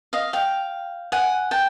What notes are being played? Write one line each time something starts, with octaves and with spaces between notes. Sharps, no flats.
D#5 F5
F5 G5
F#5 G#5
G5 A5